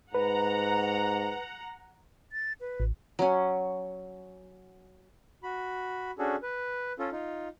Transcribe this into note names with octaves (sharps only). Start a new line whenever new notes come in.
G#2 B4 F#5 A#5
A6
B4
A1
F#3 C#4
F#4 B5
C#4 D4 F#4 G#4 A4
B4
C#4 F4 A4
D#4 F4